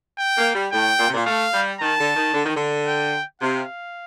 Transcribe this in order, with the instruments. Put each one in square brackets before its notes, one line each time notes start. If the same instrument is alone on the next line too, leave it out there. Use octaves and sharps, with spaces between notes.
[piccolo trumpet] G5
[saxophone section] A#3
G3
[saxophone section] A2 [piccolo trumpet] G5
[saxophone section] A#2
C3
A#2
[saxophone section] A3 [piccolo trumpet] F5
[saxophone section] G3
[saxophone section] D#3 [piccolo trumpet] A5
[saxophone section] D3
D#3
D3
D#3
D3
[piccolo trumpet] G5
[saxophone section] C3 [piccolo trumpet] F5